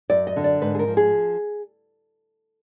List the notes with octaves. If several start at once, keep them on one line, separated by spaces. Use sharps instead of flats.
F#2 D5
D#5
D3
D5
G#2 B4
G#4
A#4
F3
G#4